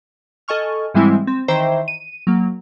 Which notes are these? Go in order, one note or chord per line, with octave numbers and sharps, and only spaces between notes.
A4 D#5 G#5 C#6 F6
G#2 E3 G3 G#3 C4 E4
C4
D#3 E3 C5 E5 G5 A#5
D#7
F#3 A#3